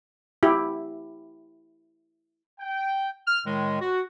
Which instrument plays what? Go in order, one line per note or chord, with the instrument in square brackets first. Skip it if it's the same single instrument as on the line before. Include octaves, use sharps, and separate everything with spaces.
[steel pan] E4 G4
[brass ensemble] G5
[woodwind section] F6
A2 D#3 G#3
F#4